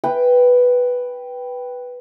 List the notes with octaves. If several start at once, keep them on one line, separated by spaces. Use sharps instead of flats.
B4 G5